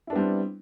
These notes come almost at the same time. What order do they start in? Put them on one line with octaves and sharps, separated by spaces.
E4 D4 B3 G3 C4